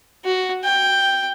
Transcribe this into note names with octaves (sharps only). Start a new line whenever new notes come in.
F#4
G5